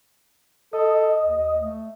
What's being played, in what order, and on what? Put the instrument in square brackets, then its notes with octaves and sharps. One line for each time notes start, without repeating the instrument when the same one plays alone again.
[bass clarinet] A4 [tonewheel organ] D#5
[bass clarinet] D#2
A3